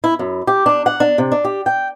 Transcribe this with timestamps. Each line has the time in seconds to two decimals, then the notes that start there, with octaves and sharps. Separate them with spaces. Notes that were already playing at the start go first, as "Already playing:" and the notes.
0.04 E4
0.19 F#2
0.47 G4
0.66 D4
0.86 F#5
1.00 D4
1.18 C3
1.32 D4
1.45 G4
1.66 G5